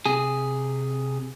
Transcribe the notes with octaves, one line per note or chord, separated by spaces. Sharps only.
C3 G#4